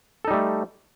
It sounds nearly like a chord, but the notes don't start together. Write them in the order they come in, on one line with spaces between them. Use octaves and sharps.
A4 D#4 G3 A3